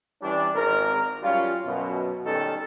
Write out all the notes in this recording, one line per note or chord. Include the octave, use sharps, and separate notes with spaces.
E3 G3 C#4 D4
G#1 A#4
F#2 G3 C#4 F4
F#2 B2
B2 D#3 G3 C#4 A4